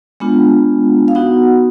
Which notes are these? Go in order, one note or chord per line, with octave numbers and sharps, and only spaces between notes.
G#3 B3 D4 F4
F5
B3 D#4 F#4 F#5